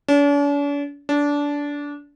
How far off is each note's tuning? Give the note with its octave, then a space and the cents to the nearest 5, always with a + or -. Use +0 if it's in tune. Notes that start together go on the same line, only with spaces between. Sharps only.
D4 -45
D4 -20